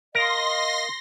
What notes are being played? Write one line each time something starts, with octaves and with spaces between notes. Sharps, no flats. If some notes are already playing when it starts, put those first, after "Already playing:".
A#4 D#5 F5 C6 A#6